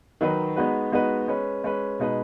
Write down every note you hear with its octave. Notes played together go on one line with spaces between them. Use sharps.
D#3 F#3 D#4 F#4 B4
G#3 B3 D#4 F#4 B4
G#3 B3 D#4 F#4 B4
G#3 C#4 B4
G#3 C#4 B4
B2 G#3 D#4 B4